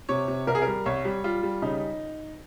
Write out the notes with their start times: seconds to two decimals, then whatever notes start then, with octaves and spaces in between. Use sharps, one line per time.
0.09 C3 C#5
0.28 C3
0.47 C2 A#4
0.55 G#4
0.62 G3 A#4
0.86 C2 C#5
1.05 G3
1.24 G3 F4
1.43 G3
1.62 C#3 D#4